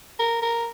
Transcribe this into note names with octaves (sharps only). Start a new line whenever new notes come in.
A#4
A#4